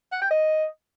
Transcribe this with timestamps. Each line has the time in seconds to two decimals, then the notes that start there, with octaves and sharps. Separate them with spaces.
0.12 F#5
0.22 G5
0.31 D#5